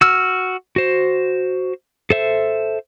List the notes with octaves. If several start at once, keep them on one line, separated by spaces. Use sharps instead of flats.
F#4 E6 F6
F#4 C5
A4 C5 E5